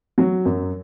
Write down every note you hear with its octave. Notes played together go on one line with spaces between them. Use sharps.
F#3
F#2